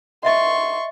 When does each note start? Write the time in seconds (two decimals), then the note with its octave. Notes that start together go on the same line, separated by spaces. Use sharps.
0.23 D#5 E5 C6 C#6 A6